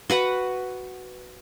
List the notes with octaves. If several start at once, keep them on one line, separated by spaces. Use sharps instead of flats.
F#4 B4 F#5